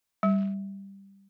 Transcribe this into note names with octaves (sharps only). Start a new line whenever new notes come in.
G3